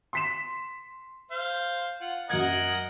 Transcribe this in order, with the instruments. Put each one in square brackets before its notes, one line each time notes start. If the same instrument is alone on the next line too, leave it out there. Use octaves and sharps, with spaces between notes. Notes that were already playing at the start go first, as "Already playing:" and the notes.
[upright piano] C6 B6 E7
[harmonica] C5 F5
F4 F#5
[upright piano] F#2 G#6 [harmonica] A#4 D#5 F#5